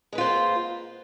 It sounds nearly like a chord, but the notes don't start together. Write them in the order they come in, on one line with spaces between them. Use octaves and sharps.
G#3 B4 F4 C5 A#3